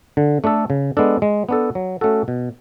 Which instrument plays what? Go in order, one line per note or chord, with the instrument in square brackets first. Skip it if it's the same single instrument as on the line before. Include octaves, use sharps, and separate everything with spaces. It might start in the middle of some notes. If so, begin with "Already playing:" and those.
[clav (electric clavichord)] D3
A3 D4 A4
C#3
G#3 B3 D4 A4
G#3
B3 D4 A4
F#3
A3 C#4 F#4 A4
B2